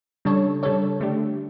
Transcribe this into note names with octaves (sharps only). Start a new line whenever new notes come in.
C#3 G3 D4 A4 C#5
C#3 G3 D4 A4 C#5
D3 A3 D4 G4